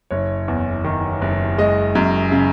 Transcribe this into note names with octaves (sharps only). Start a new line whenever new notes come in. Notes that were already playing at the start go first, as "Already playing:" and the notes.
F#1 C#5
E2
D#3
F#1
G#3 D#5
F#2
C#3